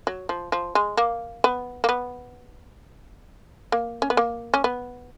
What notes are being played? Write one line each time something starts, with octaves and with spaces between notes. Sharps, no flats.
F#3
F3
F3
G#3
A#3
B3
A#3
B3
A#3
C#4
B3
A#3
C#4
B3